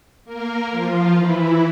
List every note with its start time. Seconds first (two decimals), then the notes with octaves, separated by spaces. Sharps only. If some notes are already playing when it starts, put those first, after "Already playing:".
0.25 A#3 A#4
0.71 F3 F4
1.17 E3 E4